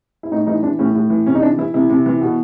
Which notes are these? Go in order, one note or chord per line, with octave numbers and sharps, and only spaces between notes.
E4
A2 D#4
E3 D#4
E3 D4
A2 C#4
A2
E3
C3 C#4
D#4
E3 D4
E3 E4
C3 E4
C3
E3
B2